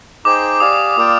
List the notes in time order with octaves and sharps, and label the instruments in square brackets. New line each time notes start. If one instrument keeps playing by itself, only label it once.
[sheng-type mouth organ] D#4 G#4 C5 G5 [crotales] D6
[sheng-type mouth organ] G4 D5 F5 G#5 [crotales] D#6
[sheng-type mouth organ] A#3 F4 A#4 D5 G5